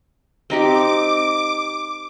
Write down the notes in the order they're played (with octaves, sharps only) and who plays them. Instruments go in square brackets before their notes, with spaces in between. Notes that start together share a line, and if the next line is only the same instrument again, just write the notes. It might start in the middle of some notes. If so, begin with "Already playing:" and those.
[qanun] C4 D#4 G4 [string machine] D6